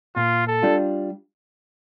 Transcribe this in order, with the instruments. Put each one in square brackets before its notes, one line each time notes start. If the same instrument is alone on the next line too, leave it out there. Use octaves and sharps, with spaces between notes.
[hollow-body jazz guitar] A#2 [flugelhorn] F4
[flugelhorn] A4
[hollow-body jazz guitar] G3 D4 F4